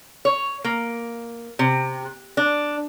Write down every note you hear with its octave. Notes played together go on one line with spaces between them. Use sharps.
C#5
A#3
C3
D4